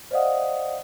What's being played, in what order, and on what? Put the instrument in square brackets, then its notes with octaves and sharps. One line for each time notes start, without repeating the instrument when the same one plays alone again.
[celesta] C5 D5 D#5 F5 F#5 D#6